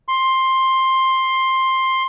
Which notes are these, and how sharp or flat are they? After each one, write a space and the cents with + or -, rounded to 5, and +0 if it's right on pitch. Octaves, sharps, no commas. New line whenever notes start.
C6 +10